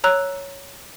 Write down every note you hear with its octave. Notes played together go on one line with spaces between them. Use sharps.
C#5 A#5 E6 F#6